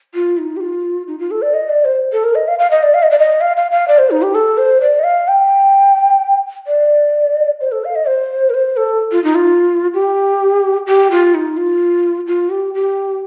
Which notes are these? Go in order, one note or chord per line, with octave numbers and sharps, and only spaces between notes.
F4
D#4
G4
F4
D#4
F4
A4
D5
D#5
D5
C5
A4
A#4
D#5
F5
F5
D#5
D5
F5
D#5
D5
D#5
F5
F5
F5
D5
C5
D#4
G4
A4
C5
D5
D#5
F5
G5
D5
C5
A4
F5
D#5
C5
A#4
C5
A4
F4
D#4
F4
G4
G4
F4
D#4
F4
F4
G4
G4